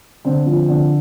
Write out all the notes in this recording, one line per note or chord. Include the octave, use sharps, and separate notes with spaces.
D3 C4
F3
D3